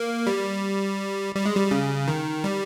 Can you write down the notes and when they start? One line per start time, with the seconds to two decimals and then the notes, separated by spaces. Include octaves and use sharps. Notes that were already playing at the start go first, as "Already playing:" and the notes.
Already playing: A#3
0.27 G3
1.35 G3
1.46 G#3
1.56 G3
1.71 C#3
2.07 D#3
2.44 G3